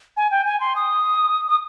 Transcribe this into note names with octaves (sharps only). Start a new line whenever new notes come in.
G#5
G5
G#5
C6
D#6
D#6